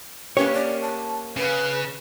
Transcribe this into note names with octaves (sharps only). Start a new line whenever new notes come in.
A#3 C#4 G4 B4 C#5
D5
A5
C#3 B4